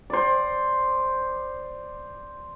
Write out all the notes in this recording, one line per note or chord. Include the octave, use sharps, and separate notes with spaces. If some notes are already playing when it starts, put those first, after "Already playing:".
C5 D5